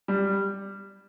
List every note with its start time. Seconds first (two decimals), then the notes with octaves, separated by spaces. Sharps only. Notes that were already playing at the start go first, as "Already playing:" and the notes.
0.08 G3